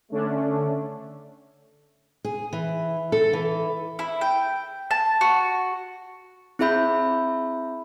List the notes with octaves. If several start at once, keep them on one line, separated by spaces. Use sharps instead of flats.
D3 A3 C#4 D4
G#4
E3
A4
E3
E4
G5
A5
F#4
C4 E4 G#4 E5 B5 G6